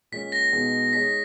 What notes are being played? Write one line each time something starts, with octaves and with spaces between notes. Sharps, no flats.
A#2 G#3 C#4 B6
A#6
B2 G#3 B3 D#4 G#4
G#3 D#4 G#4 C#5 B6